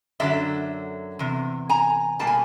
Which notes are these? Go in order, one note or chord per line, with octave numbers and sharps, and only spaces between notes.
F#2 D3 F#3 D5 E5
E2 C3
G#5 A#5
B2 G3 A#3 A5
G#5